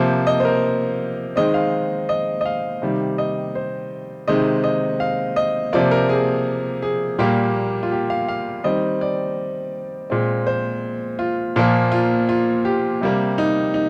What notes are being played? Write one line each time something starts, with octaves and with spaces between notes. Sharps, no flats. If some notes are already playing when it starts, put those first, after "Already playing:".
Already playing: C3 F3 A#3 C5
D#5
C5
A#4
D#3 G#3 C4 D#5
F5
D#5
D#5
F5
C3 D#3 G3
D#5
C5
C3 D#3 G#3 C4 D#5
D#5
F5
D#5
C3 F3 A#3 D5
A#4
G#4
G#4
A#2 G3 A#3 G4
F4
G4
F5
F5
D#3 G3 C4 D#5
D5
A#2 G#3 C4
C5
F4
A#2 F3 A#3
F4
F4
G4
C3 G3 A#3
D#4
D#4